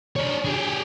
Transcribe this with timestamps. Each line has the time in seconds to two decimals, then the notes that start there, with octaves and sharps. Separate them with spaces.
0.16 D4 C#5
0.45 G4 G#4